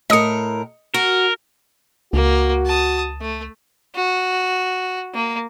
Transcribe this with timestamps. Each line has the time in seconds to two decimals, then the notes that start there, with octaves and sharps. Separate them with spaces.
0.10 A2 A#4 D#5 D#6 C#7
0.94 F#4 A#4
2.13 C#2 A#3 F#4
2.66 A5 D#6
3.21 A3
3.96 F#4
5.14 A#3